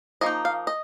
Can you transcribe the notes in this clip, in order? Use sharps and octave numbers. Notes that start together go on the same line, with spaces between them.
F3 A#3 D#4 D#5
F5
D#5